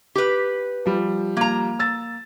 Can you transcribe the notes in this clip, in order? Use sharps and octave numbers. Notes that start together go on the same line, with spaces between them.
G4 B4
F3 G3
A#3 A#5
E6 A6